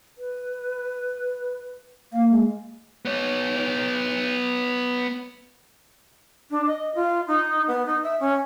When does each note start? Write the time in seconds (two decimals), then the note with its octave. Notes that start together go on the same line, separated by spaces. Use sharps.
0.18 B4
2.13 A#3 F5
2.30 G#3
3.05 B3 C#5
6.51 D4
6.67 D#5
6.95 F4
7.27 D#4
7.68 B3
7.86 D#4
8.03 E5
8.20 C#4